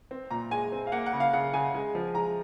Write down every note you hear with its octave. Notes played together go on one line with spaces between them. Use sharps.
C4
A#2 A#5
G#3 G#5
C4
F5
A#3 F#5
F#5
C#3
F5
C#3 F#5
C#3 G#5
G#3
F3
G#3 A#5